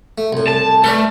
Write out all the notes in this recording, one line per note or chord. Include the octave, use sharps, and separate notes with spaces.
A3
C2 A2
A5
A3 A#4 B4 D5